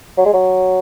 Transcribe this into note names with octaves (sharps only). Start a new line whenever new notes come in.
F#3
G#3
F#3